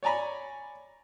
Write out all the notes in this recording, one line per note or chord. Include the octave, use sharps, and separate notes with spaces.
C#5 D5 G#5 A#5 B5